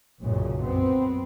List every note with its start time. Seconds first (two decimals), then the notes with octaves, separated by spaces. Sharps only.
0.22 B1 F#2 A#2 C#3
0.63 F#2 B3 C4